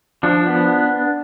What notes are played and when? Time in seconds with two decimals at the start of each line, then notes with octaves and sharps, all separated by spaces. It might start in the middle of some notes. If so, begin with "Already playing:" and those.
0.23 F3 D4
0.46 B3